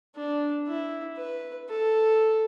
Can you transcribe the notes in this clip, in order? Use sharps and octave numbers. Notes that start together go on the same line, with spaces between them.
D4
E4
B4
A4